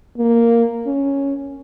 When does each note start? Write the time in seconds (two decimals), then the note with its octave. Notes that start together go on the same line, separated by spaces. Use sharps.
0.18 A#3
0.86 C#4